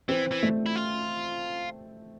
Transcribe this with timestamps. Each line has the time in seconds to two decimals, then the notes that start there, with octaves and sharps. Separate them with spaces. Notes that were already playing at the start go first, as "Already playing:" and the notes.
0.09 E3 C4
0.31 E3
0.43 A3
0.66 E4
0.76 F4